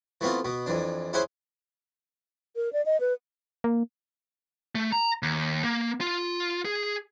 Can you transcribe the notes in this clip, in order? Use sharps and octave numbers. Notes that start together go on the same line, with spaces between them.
E3 A3 B3 C4 F4
B2 B3
F2 E3 D4
C#4 E4 G#4 C5 F#5 G#5
A#4
D5
D#5
B4
A#3
A3
A#5
D#2
A#3
F4
G#4